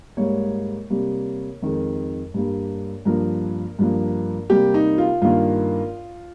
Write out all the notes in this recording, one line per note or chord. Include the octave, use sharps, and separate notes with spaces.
G#2 G3 A#3 C#5
C3 G3 A#3
F2 D#3 G#3
G2 G3 A#3
G2 F3 A#3 A#4
G2 F3 A#3
C3 G3 A#3 G4
D#4
F4
G2 D#3 A#3 F4